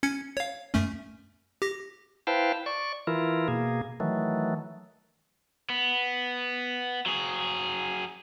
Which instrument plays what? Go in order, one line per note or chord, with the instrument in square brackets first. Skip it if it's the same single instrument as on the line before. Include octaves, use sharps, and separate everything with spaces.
[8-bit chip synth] C#4 G#6 C#7
C#5 F5
F#2 A3 C#4
G4 A#6
[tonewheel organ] E4 B4 C5 F5 G5 A5
D5 C#6
E3 E4 F4 A#4
B2 A#3 G#4
D#3 E3 F#3 A3
[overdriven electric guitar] B3
F#3 G#4